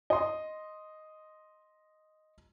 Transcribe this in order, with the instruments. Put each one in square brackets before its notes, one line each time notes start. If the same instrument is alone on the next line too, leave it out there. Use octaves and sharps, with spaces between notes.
[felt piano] D#5 C6